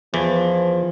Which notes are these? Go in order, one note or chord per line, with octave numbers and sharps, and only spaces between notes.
E2 E3 F3